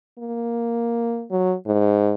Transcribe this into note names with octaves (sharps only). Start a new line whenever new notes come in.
A#3
F#3
G#2